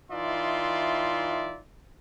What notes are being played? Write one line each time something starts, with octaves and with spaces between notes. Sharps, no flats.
E3 D#4 F4 D5 E5 C6